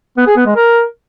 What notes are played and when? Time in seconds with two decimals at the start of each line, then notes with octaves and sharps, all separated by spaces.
0.17 B3
0.27 G#4
0.36 B3
0.46 G#3
0.56 A#4